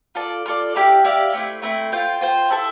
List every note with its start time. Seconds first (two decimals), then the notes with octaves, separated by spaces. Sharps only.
0.15 F4 A4 D5
0.46 F4 A4 D5
0.75 E4 G4 D5 F5
1.05 E4 G4 D5 F5
1.33 A3 C4 E4
1.62 A3 C4 E4
1.92 F4 C5 G5
2.21 F4 C5 G5
2.50 E4 A4 E5 A5